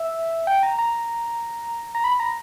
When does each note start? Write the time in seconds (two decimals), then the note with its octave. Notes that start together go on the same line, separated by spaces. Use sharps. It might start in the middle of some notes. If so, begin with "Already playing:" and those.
Already playing: E5
0.47 G5
0.63 A#5
0.79 A#5
1.95 A#5
2.04 B5
2.20 A#5